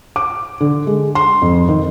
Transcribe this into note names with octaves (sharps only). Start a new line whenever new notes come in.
D6
D3
G#3
C6
F2
D#3